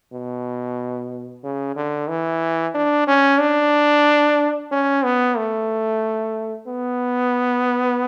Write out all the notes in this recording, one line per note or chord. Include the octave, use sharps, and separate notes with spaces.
B2
C#3
D3
E3
D4
C#4
D4
C#4
B3
A3
B3